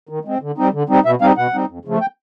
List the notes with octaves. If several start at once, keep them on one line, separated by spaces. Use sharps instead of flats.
D#3
G#3 C4
D3
G3 C4 D#4
D3
G3 C4 D#4
B2 E5
G3 C4 D#4 F5
B2 F#5
G3 C4 D#4
F2
C#3 F3 A3
G5